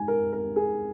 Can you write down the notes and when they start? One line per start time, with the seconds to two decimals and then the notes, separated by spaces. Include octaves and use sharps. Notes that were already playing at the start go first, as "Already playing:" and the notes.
Already playing: G#2 G#5
0.08 A#4
0.33 A#4
0.56 G#4